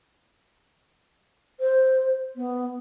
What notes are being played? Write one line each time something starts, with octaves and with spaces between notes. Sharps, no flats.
C5
B3